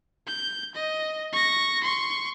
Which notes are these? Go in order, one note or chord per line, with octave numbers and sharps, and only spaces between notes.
G6
D#5
C#6 A#6
C6 C#6